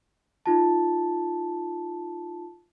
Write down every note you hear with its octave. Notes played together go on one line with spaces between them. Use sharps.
D#4 F4 A5